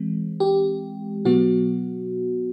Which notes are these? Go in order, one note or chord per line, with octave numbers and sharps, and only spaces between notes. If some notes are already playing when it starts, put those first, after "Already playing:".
Already playing: E3 G#3 C4
G4
B2 F#3 B3 F#4